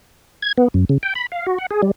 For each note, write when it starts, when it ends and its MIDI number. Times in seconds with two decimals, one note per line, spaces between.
0.42 0.52 92
0.58 0.68 59
0.74 0.85 42
0.89 0.98 49
1.03 1.14 79
1.15 1.27 83
1.32 1.46 77
1.47 1.58 66
1.58 1.66 78
1.71 1.81 68
1.82 1.91 55